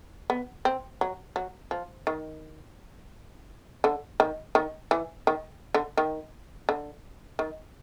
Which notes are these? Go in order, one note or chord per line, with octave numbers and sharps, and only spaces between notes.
B3
C4
F#3
F#3
F3
D#3
D3
D#3
D#3
E3
D#3
D3
D#3
D3
D#3